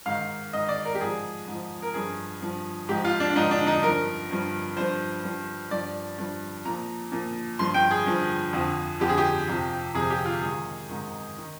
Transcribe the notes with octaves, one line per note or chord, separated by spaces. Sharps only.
G#2 D#3 F5
G#2 D#3 D#5
D5
A#4
G4
G#2 F3 G#4
G#2 F3
A#4
G2 F3 G#4
G2 F3
G#2 F3 G4
F4
D4
G#2 F3 D#4
D4
D#4
G2 F3 A#4
G2 F3
G2 F3 C5
G2 F3
G2 F3 D5
G2 F3
A#2 F3 A#5
A#2 F3
G2 F3 C6
G5
G#4
G2 F3
F2 D3 F3
F2 D3 F3 G4
G#4
G4
F2 C3 F3
F2 C3 F3 G#4
G4
F4
G#2 D#3 G#4
G#2 D#3
D#3